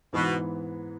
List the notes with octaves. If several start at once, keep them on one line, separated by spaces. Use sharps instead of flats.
G#2 B2 E3 B3